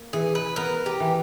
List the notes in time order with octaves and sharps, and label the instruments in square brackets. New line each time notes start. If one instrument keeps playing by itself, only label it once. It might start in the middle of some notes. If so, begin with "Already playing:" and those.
Already playing: [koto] A#3
[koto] E3 [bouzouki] G#4
[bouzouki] B4
[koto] B3 [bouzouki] A#4
[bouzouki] G4
[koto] E3